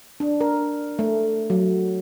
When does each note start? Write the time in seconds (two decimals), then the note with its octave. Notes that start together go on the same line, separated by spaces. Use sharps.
0.20 D4
0.41 A#4
0.99 A3
1.50 F#3